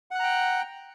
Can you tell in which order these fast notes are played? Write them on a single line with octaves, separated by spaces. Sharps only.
F#5 F#6 A#5 G5